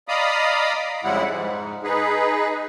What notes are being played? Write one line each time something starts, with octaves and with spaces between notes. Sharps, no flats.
D5 D#5 F5 A#5 B5 D#6
F2 C#3 G3 G#3 E4 F#5
G#2
D#4 G#4 B4